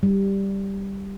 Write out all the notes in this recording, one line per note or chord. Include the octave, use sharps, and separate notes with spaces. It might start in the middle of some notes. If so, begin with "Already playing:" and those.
G3